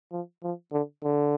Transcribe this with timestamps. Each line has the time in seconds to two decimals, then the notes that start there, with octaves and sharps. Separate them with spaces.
0.12 F3
0.43 F3
0.72 D3
1.03 D3